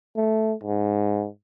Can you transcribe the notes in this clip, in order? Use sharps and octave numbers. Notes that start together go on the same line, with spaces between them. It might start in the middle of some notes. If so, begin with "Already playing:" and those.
A3
G#2